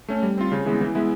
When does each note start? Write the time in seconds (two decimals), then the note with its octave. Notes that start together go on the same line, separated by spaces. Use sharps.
0.08 A3 C#4
0.22 G3
0.38 C4 F4
0.52 C#3
0.66 E3 G#3 B3
0.81 E3
0.95 G#3 B3 E4